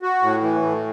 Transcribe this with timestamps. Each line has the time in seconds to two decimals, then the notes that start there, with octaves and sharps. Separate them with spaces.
0.02 F#4
0.22 A2
0.42 E3
0.62 A2